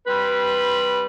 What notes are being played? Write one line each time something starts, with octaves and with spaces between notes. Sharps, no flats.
G3 C4 B4